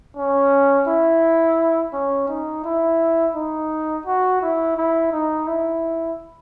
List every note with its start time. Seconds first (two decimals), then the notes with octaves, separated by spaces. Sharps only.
0.17 C#4
0.87 E4
1.93 C#4
2.29 D#4
2.64 E4
3.35 D#4
4.06 F#4
4.41 E4
4.77 E4
5.13 D#4
5.48 E4